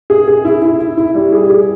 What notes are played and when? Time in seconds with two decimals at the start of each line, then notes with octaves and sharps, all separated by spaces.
0.10 G#4
0.28 G#4
0.45 E4
0.62 E4
0.79 E4
0.97 E4
1.15 G3
1.33 G#4
1.49 G#4